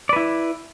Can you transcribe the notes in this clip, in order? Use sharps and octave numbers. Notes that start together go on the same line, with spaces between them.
E4 B4 D5